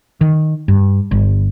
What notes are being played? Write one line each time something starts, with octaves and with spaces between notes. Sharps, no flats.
D#3
G2
G1